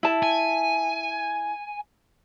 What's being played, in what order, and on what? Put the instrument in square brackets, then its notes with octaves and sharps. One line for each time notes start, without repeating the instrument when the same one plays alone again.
[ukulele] E4 A5
[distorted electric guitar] G#5